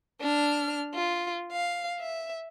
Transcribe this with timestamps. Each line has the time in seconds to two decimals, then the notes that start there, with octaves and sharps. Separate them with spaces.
0.21 D4 F6
0.94 F4
1.52 F5
2.00 E5